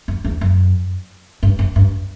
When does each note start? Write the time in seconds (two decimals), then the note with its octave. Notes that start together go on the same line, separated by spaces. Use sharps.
0.08 F#2
0.24 E2
0.41 F#2
1.43 G2
1.59 F#2
1.76 G2